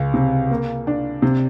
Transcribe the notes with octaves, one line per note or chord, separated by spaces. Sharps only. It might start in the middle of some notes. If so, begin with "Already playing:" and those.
Already playing: C#2
C3
A#3
D4
C3